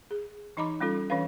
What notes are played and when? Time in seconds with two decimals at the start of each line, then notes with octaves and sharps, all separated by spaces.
0.11 G#4
0.57 E3 D#4 D#5 A#5 B5 D6
0.80 G3 C#4 F4 A4
1.10 E3 C#4 D4 B4 F5